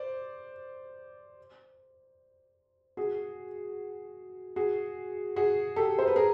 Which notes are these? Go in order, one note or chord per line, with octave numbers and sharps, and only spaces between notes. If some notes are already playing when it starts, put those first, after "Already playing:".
Already playing: C5 D5
F#4 G#4
F#4 G#4
F#4 G#4
G4 A4
C5
B4
G#4 A#4